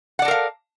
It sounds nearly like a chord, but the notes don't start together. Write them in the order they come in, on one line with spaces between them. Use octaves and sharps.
F#5 D5 A4 A#4 F5